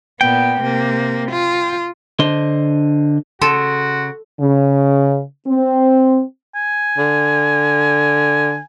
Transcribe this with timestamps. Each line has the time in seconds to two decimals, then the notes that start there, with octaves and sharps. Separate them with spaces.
0.21 A#2 B3 G5
0.61 C3 A#3
1.31 F4
2.19 D3 D4 C5 D#5 C6
3.41 C#3 F#4 A4 C6
4.40 C#3
5.47 C4
6.55 G#5
6.98 D3